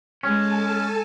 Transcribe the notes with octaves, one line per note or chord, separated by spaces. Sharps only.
G#3 C#4 A4 G#5 A5